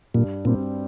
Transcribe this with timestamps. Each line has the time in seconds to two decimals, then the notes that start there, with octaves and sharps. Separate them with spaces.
0.14 G2 A#2
0.45 A#2 G3 C4 G4